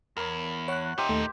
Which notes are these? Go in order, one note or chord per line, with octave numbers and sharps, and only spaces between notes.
E2 A#4 C#5
C#5 F#5 F#6
A#2 D#4 G4 C5 E5
D#2 A3